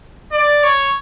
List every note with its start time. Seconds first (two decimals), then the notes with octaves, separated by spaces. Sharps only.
0.32 D5
0.64 C#5